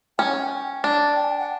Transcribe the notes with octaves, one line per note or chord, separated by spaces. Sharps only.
C#4 G5
F#5
G5
D4
G5
G#5
G5
F#5